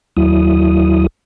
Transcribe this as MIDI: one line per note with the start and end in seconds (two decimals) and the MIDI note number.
0.17 1.07 39
0.17 1.07 54
0.17 1.07 64
0.17 1.07 87